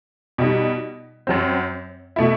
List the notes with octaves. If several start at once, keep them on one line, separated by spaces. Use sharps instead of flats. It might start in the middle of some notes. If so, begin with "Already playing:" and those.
B2 G3 D#4
F#2 F#3 C4
B2 A3 E4